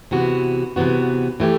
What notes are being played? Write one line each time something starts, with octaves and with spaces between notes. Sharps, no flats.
C3 E3 B3 F#4
C3 E3 B3 F#4
E3 A3 E4 G4